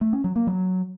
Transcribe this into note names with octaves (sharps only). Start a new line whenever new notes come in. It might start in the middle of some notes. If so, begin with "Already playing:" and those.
A3
C#4
F#3
A#3
F#3